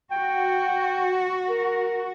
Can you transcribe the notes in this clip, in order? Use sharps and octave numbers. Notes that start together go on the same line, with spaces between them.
F#4 G5
A#4